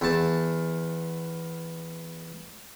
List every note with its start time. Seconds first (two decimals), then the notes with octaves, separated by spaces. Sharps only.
0.01 E2 A5